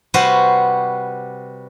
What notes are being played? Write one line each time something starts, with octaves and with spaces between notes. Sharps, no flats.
C3 G3 F#4 B4 C5